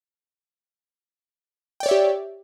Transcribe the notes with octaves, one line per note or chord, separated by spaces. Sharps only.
G4 C#5 D5 E5 G5